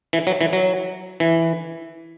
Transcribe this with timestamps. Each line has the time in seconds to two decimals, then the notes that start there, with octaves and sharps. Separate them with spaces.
0.13 E3
0.27 F#3
0.41 E3
0.53 F#3
1.20 E3